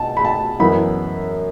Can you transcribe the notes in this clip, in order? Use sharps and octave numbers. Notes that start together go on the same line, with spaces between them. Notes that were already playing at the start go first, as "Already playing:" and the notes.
Already playing: B2 A5
B5
A5
F#2 E3 B3 B5